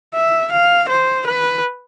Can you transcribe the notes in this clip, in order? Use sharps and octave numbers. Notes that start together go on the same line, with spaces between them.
E5
F5
C5
B4